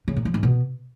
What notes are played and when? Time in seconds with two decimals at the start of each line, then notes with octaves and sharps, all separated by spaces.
0.08 C#3
0.16 A#2
0.25 F3
0.34 G#2
0.43 B2